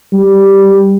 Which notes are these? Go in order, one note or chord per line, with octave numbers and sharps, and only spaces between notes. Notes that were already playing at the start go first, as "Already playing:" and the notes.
G3